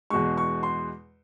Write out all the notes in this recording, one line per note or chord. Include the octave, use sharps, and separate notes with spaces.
E2 B2 G#3 C#6
C#6
C6